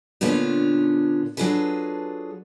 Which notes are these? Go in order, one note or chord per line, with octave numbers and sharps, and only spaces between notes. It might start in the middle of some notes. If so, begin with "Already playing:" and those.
A#2 D3 B3 C#4 D4 F4
F#3 D4 F4 G#4 A4 B4